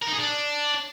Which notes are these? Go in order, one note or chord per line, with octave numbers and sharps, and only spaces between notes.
A#4
D#4
G#4
D4